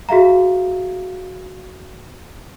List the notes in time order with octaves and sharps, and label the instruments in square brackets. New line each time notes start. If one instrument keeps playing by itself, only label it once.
[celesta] F#4 G#4 E5 F5 A#5